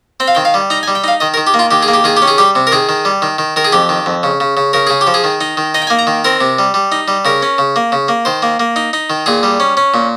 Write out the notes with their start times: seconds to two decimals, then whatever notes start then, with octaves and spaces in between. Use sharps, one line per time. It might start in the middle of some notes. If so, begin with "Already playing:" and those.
0.20 C4 G5
0.28 F5
0.35 D#3 G5
0.45 F5
0.54 G3
0.70 D#4 A#5
0.83 G#5
0.88 G3
0.95 G5
1.04 D#4 F5
1.20 D#3 D#5
1.34 A#4
1.37 D#3
1.47 G4
1.54 A#3
1.59 F4
1.71 D#3 G4
1.83 G#4
1.88 A#3
1.94 G4
2.04 D#3 G#4
2.17 G4
2.22 C#4
2.28 G#4
2.38 G3 G4
2.55 C3
2.67 A#4
2.72 D#3 G#4
2.89 D#3
3.05 G3
3.22 D#3
3.38 D#3
3.56 D#3 A#4
3.64 G#4
3.72 F2 G4
3.89 D#3
4.06 F2
4.23 C#3
4.40 C#3
4.57 C#3
4.73 C#3 A#4
4.87 C#3 G#4
5.01 G4
5.07 F3
5.14 G#4
5.24 D#3
5.41 D#4
5.57 D#3
5.74 D#4 D#5
5.82 G5
5.87 G#5
5.90 A#3
5.99 A#5
6.07 D#3
6.24 C4 A#4
6.41 C3
6.59 G3
6.74 G3
6.92 D#4
7.08 G3
7.25 C#3 A#4
7.42 C#4
7.58 C#3
7.76 A#3
7.92 C#3
8.08 A#3
8.25 D#3 C5
8.42 A#3
8.60 A#3
8.76 D#4
8.93 D#4
9.10 D#3
9.26 A#2 G#4
9.43 G3
9.60 C#4
9.77 C#4
9.94 A#2